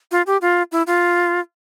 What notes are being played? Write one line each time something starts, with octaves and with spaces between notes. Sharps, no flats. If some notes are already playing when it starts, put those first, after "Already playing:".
F4
G4
F4
E4
F4